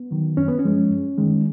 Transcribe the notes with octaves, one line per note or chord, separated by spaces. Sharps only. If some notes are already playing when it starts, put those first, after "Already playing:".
Already playing: B3
D#3 F#3
F#2 C#4
B3
C#4
F3 G#3
F#2
D#3 G#3